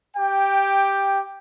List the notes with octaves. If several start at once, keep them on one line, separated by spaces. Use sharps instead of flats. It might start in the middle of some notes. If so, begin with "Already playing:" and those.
G4 G5